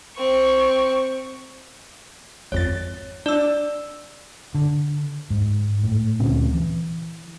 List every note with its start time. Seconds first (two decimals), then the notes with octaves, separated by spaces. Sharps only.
0.17 C4 C#6
2.52 G#1 F2 C#5 A6
3.26 D4 D5 E6
4.55 D3
5.30 G#2
5.84 A2
6.20 D2 A#2 C4 C#4
6.54 E3